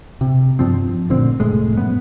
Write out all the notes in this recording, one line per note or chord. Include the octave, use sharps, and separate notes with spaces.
C3
G2 F3 C4
A1 A#2 D3 C4
F1 F2 A2 G#3
F#2 B3